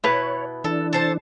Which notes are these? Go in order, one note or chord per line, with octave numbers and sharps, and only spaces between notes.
B2 E4 B4 C#5
E3 D4 A4
A4 C5 A5